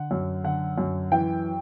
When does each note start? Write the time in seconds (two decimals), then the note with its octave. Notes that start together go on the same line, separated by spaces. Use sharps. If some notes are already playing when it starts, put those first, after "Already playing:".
Already playing: D3 F#5
0.11 F#2
0.44 D3 F#5
0.78 F#2
1.12 E3 G5